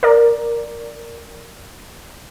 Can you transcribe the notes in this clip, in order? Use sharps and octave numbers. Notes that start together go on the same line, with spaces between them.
A#4 D5